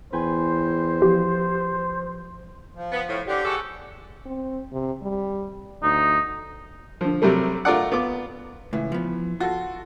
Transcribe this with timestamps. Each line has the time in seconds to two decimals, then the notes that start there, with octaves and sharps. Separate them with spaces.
0.13 E2 B4 C5 G5 G#5
1.02 F3 G4
2.76 F3
2.92 B3
3.07 A2
3.27 D3 G4
3.44 G#3 F#4 A4
4.26 C4
4.72 C3
5.02 G3
5.83 D2 D#4
7.01 D3 F3
7.22 C3 F#3 G3 A3
7.65 A3 F4 A#4 D5 F#5
7.92 B3 F4 D6
8.73 C#2 A2 E3
8.92 F3 B3
9.40 F4 F#4 A4